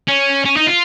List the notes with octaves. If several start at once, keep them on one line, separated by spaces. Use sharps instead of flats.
C#4
C#4
D#4
F4